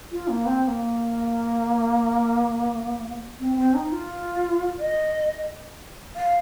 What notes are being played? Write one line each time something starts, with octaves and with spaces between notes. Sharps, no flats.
F4
A#3
C4
C4
A#3
C4
C4
D#4
F4
D#5
F5